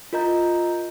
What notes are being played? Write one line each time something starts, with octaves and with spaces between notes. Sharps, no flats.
F4 A#4 D#5 A#5 G6